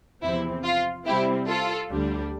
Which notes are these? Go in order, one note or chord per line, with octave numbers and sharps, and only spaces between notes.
E2 C3 F3 C4 E4
F4
C3 G3 C4 E4 G4
F4 A4
D2 D3 G3 D4